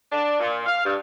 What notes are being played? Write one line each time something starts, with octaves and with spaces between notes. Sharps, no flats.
D4
A#2
F5
G2